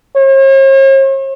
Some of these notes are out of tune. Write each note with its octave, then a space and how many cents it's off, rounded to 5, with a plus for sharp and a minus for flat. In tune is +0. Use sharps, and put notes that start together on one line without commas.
C#5 -45